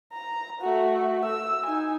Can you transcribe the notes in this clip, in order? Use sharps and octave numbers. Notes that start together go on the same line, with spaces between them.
A#5
A3 F#4
E6
D#4 G#5